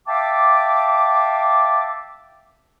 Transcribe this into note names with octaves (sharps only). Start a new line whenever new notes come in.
E5 F5 G5 A5 D6